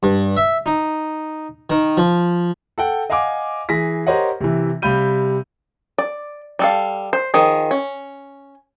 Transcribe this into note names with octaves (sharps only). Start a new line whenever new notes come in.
G2
E5
D#4
D#3
F3
A4 F#5 G5
D#5 F5 F#5 G#5 D6
E3 G#4 A#6 B6
G4 A#4 C5 C#5 D#5 F#5
C3 E3
C3 G3 F5 B5 G6 D#7
D5
G3 A4 F5
C5
D#3 F3 G#4
C#4